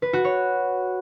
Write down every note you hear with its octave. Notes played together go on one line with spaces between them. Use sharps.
B4
F#4
C#5